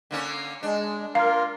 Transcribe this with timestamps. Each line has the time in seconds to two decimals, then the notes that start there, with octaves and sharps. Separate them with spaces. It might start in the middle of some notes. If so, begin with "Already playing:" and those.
0.11 D3 A#3 C#4
0.63 G#3 D4
1.15 A#3 F4 A#4 F5